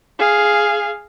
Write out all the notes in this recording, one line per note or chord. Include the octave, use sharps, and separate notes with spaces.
G#4 F5